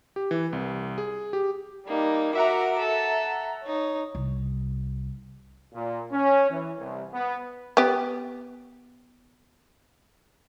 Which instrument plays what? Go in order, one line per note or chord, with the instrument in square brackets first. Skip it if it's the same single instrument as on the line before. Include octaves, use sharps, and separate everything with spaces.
[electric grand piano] G4
E3
C2
G#4
G4
[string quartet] G3 A#3 D#4
[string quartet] F#4 A#4 D6 [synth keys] E5 F#5 A#5
[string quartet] A4
D#4 C#5
[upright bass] C2
[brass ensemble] A#2
C#4
E3
C2
B3
[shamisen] B3 G4